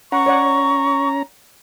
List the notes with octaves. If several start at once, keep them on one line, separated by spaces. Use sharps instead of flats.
C#4 F#5 A#5 C#6
C#5 D5 F#5